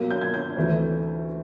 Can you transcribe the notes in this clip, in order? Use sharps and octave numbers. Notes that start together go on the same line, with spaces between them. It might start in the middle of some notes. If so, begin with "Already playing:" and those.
Already playing: B2 F#3 A#3
G6
G#6
G6
D2 C3 E3 A3